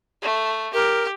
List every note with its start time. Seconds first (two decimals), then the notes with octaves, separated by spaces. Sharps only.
0.22 A3
0.74 G4 A#4